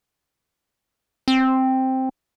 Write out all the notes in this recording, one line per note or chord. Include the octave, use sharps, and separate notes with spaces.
C4